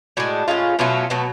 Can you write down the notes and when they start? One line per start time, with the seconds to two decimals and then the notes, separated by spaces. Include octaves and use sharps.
0.17 A2 G#3 D4 F#4
0.48 A2 G#3 C#4 F4
0.79 B2 F#3 A3 C#4 F4
1.10 B2 F#3 A3 B3